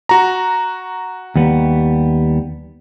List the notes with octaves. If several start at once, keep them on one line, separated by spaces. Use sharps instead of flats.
F#4 A#5
D#2 G3 B3